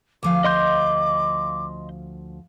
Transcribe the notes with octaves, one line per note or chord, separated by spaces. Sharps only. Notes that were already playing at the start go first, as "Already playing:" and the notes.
D2 F3 F5 D6
D#5 C6 G6